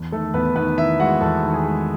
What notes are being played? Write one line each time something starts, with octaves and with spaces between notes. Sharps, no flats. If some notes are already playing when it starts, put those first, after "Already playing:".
Already playing: E2
D#3 A3 A4
E2 B3 B4
D#3 B3 B4
D#3 E4 E5
G#3 F#4 F#5
E2 A4 A5
D#3 F#5
G#4 G#5
G#3